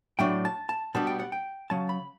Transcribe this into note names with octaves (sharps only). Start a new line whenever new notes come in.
A2 F#3 A3 D4 G5
A5
A5
B2 G3 B3 D4 A5
G5
F#5
G5
C#3 F#3 C#4 A5
B5